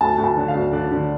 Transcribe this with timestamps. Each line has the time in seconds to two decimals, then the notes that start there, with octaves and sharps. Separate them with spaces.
0.01 D2 A5
0.18 D2
0.24 A5
0.37 D3
0.48 F5
0.55 D2
0.73 D3 D5
0.91 D3